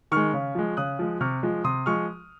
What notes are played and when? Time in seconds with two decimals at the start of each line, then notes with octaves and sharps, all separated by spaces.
0.12 D#3 G#3 C#6 F6
0.34 C#3
0.55 F3 G#3
0.77 C#3 D#6 F#6
0.99 F3 G#3
1.21 C3 C#6 F6
1.43 F3 G#3
1.64 C3 C6 D#6
1.86 F3 G#3 C#6 F6